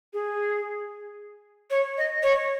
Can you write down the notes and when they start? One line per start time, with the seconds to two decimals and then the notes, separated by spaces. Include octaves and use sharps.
0.13 G#4
1.70 C#5
1.98 D#5
2.23 C#5